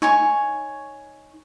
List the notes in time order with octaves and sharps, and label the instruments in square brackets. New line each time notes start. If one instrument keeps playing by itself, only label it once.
[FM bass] D#4 [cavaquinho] C#5 G#5 C#6